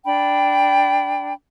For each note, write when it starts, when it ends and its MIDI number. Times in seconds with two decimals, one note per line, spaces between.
0.04 1.33 62
0.04 1.33 79
0.04 1.33 83